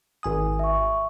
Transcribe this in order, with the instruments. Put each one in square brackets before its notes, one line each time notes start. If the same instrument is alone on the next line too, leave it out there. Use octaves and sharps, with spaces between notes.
[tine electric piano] G#1 G#5 D#6
[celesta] E5 C#6